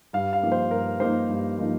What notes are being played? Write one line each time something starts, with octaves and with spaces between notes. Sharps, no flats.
G2 F5
F5
F3 A#3 D#4
C5
G2 A#4
F3 A#3 D#4 C5
G2
F3 A#3 D#4